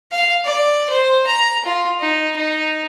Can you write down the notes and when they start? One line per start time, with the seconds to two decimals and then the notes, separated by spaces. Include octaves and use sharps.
0.12 F5
0.45 D5
0.89 C5
1.26 A#5
1.65 F4
2.00 D#4
2.36 D#4